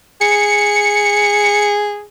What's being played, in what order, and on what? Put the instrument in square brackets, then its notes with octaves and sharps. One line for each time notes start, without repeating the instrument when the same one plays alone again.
[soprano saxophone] G#4 [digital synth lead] C#7